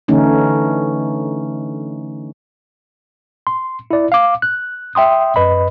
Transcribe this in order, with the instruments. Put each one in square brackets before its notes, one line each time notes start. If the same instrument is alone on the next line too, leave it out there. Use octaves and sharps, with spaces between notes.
[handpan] D3 E3 A3 C#4 D#4
[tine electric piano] C6
E4 D5
F5 D6
F#6
E5 G5 C6 D#6
F#2 B4 D#5 B5